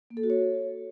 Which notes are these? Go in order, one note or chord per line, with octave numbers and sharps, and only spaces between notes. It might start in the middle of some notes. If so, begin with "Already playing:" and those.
A#3
A4
F#4
C#5